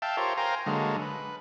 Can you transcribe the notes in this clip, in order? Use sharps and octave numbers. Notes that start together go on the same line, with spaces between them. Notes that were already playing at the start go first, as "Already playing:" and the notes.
E5 F5 G5 A5
F4 G4 A#4 C5 C#5
A#4 C5 F5 G5 G#5 A#5
D3 F#3 G#3 A#3
B4